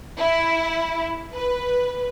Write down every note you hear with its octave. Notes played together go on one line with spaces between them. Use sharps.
E4
B4